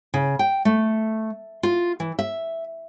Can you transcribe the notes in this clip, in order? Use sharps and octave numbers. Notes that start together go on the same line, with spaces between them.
C#3
G5
A3
F4
E3
E5